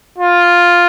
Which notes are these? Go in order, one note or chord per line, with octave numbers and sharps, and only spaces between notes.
F4